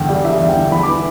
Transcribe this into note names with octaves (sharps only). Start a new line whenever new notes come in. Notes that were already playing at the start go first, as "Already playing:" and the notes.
Already playing: E2 G2 D3 G5
G3 D5
E2 E5
E2
G5
D3
E2 B5
E3 D6